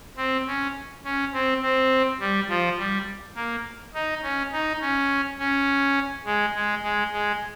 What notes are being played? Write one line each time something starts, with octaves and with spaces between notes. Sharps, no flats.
C4
C#4
C#4
C4
C4
G3
F3
G3
A#3
D#4
C#4
D#4
C#4
C#4
G#3
G#3
G#3
G#3